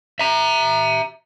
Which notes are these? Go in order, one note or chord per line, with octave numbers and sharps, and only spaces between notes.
E5 A#5